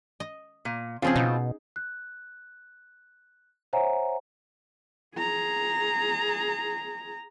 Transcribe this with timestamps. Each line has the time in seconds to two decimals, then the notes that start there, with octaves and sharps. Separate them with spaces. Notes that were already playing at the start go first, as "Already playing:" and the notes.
0.20 D#5
0.65 A#2
1.02 C#3 F3 C4 F4 G#4
1.16 B2 D#4
1.76 F#6
3.73 C5 C#5 E5 F#5 G#5 A#5
5.17 G#4 A#5